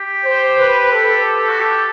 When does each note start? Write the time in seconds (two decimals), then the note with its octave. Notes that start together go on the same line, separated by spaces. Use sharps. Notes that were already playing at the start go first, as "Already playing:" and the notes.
Already playing: G4
0.25 C5
0.58 B4
0.93 A4
1.49 F#4
1.59 G4